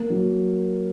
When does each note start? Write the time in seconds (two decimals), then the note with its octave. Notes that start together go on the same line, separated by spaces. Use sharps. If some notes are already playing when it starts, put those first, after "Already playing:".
Already playing: A#3
0.10 F#3